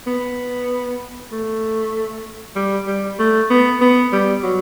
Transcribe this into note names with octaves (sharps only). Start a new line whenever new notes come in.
B3
A3
G3
G3
A3
B3
B3
G3
F#3